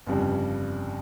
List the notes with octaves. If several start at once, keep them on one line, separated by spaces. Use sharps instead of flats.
G1 F2 C#3 G3